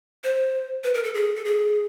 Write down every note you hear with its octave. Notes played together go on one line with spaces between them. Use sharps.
C5
B4
A#4
A4
G#4
A4
G#4